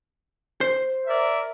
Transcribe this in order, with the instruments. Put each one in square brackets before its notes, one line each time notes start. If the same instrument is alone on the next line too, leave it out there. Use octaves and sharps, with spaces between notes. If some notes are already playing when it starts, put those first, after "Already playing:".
[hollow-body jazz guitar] C5
[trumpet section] A#4 D5 E5